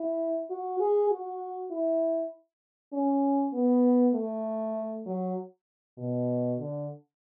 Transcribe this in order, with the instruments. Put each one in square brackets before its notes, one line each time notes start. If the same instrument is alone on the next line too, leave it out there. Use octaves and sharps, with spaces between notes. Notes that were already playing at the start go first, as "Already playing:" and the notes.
Already playing: [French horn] E4
F#4
G#4
F#4
E4
C#4
B3
A3
F#3
B2
D3